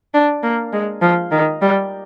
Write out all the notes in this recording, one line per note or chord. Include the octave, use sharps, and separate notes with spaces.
D4
A#3
G#3
F3
D#3
G3